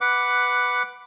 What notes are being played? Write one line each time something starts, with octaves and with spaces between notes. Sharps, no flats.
B4 F#5 D6